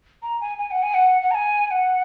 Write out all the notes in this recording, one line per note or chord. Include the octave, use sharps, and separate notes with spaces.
A#5
G#5
G#5
F#5
G#5
F#5
F#5
A#5
G#5
G#5
F#5